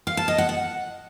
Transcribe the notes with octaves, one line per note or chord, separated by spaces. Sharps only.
F5
A5
D#5
F#5
F#5